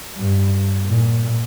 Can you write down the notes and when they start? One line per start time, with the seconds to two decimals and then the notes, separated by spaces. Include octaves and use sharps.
0.18 G2
0.86 A#2